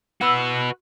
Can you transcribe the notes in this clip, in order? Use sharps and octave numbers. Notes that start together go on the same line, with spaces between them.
E4 F#4 B4 C6 E6